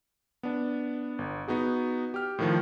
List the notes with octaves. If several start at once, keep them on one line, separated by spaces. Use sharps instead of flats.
B3 D4
G1
B3 D#4 F#4 G#4
G4 F6
A2 D#3 F3